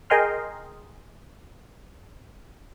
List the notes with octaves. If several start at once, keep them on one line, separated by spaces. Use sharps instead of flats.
G#4 A#4 D#5 G5 C6 F6